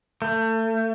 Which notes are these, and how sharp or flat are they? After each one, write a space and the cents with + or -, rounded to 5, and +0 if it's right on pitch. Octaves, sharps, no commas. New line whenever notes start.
A3 +30